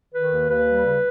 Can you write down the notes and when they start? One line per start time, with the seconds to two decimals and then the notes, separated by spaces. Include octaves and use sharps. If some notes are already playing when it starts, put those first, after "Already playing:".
0.13 D#3 B4
0.31 D#2
0.49 D#2 B4
0.67 G3
0.84 C#3